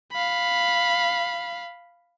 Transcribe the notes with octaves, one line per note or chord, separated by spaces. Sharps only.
F5 B5